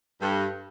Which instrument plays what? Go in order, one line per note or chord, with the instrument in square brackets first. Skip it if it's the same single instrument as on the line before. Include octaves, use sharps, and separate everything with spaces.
[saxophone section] G2 [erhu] A4